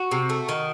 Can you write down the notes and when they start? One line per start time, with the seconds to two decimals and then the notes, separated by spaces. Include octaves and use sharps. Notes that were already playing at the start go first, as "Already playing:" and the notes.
Already playing: F#4
0.11 C3
0.29 A3
0.49 D#3